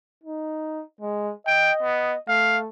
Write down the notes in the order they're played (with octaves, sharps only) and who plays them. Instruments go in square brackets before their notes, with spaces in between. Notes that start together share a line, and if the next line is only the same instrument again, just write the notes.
[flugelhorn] D#4
G#3
[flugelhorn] D#5 [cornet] G5
[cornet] B3
[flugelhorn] A3 [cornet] F5